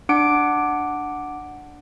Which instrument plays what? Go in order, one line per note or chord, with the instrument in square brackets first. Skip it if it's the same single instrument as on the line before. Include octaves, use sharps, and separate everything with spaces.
[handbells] D4 F#5 D6 D7